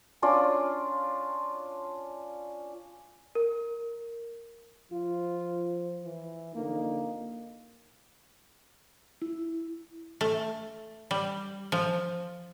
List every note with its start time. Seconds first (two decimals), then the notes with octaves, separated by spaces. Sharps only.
0.22 C#4 D4 F4 D5
3.35 A#4
4.92 F3 F4
6.04 E3
6.55 F2 D3 A#3 D#4
9.22 E4
10.21 A3
11.11 G3
11.72 F3